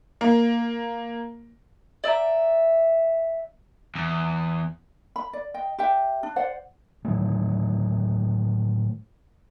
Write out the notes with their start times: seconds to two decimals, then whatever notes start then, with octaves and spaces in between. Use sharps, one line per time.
0.21 A#3
2.04 D5 E5 G5 A#5
3.95 E2
5.16 B5
5.33 D5
5.54 D#5 G5
5.78 G4 E5 G5
6.23 D4
6.36 C5 D5 F#5
7.05 A2 D#3 F#3 A3